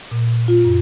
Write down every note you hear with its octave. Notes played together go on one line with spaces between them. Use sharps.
A#2
F4
F#2